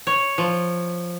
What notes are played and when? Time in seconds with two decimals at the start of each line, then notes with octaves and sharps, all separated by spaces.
0.07 C#5
0.38 F3